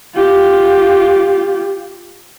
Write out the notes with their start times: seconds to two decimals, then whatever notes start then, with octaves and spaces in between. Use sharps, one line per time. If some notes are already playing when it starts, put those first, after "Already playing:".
0.15 F4 G4